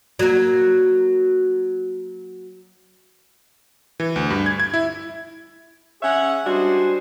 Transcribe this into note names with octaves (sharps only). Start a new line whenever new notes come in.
F#3 A#3
E3
D2
G2
G#6
G#6
E4
C#4 G#4 C#5 E5 F#5
G3 G#3 D4 F#4 G#4 C5